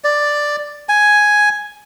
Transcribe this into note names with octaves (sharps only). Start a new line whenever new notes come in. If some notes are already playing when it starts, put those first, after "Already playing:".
D5
G#5